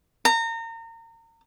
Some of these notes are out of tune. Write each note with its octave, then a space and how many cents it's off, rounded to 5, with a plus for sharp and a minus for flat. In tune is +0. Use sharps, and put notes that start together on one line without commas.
A#5 -30